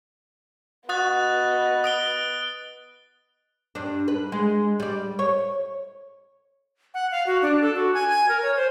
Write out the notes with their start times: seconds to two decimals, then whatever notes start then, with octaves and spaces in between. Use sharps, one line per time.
0.89 B3 F#4 D#5 D#6 F#6 A6
1.84 D#6 D7 G7
3.75 G2 D4
4.08 B4
4.32 G#3
4.80 G3 D5
5.19 C#5
6.94 F#5
7.11 F5
7.27 F#4
7.42 D4
7.62 A4
7.75 F#4
7.94 G#5
8.09 G#5
8.29 A#4
8.42 C#5
8.56 C5